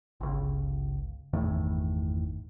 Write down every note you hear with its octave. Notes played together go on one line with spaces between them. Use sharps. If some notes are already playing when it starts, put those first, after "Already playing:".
G1 C#2
G1 E2 A2 D#3